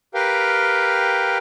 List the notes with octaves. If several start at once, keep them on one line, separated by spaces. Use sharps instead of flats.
G4 A#4 B4 F5 G5